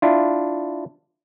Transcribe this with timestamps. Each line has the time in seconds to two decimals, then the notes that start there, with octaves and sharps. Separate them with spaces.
0.02 D4 E4 F4